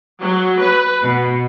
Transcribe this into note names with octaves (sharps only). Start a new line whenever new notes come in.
F#3
B4
B2